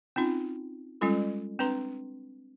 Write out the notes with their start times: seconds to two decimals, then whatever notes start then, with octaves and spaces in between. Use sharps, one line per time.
0.16 C4 C#4 D#4 F4
1.01 G3 G#3 C#4 F4 A4
1.59 C4 D4 B4 A#5 C6